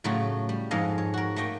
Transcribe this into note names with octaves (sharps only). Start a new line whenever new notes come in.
A2 C#3 F#3 A3 F4
G3
F2 G#2 G#3 A4 D#5 F5
C#5
F#4 A#4
A3 A#3 D#5 G5